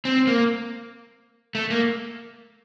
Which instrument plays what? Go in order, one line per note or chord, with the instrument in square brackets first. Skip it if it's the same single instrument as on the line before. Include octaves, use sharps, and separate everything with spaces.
[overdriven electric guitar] C4
A#3
A3
A#3